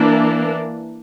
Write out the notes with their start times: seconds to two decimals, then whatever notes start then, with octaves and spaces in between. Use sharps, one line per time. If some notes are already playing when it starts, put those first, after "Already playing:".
Already playing: E3 A#3 D4